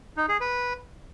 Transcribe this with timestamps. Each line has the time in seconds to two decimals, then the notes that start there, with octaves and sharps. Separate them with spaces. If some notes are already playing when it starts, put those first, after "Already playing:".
0.17 D#4
0.29 G#4
0.41 B4